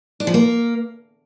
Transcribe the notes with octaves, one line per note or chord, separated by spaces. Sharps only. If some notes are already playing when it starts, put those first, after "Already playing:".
D4
F3
A#3